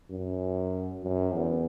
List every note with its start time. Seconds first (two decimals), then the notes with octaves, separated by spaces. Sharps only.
0.10 F#2
1.03 F#2
1.33 E2